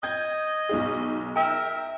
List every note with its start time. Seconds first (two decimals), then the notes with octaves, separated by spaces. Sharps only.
0.03 D#5 G6 G#6
0.69 B1 D#4 G#4
1.36 A#4 E5 G5